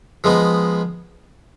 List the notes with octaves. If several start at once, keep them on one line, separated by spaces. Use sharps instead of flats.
F3 G#3 B3 D#4